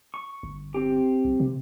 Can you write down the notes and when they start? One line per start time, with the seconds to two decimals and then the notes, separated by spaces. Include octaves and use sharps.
0.14 C#6
0.43 G1
0.74 C4 G4
1.25 B1
1.40 C3